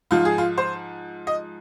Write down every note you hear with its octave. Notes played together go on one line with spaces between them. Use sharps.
G#2 F3 F4
G#4
F4
C5
D#5